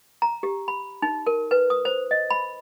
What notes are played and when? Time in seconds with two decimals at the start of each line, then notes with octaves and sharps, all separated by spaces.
0.22 A#5
0.43 G4
0.68 B5
1.02 D#4
1.27 A#4
1.51 B4
1.70 D#6
1.85 C5
2.11 D#5
2.30 B5